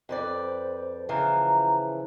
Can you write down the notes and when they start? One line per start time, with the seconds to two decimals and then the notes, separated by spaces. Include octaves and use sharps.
0.09 F2 B4 C5 D5
1.09 C#3 E3 F3 A#5